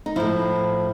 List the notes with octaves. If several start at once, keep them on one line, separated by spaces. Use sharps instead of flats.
D#4
A2 F3 E4